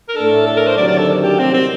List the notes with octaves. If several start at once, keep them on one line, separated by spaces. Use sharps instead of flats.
A#4
A2 A3 D4 A4
A4
A#4
C5
D2 C3 D#3 F#3 D5
D5
A4
G4
C2 C3 D#3 F#3 C4
C4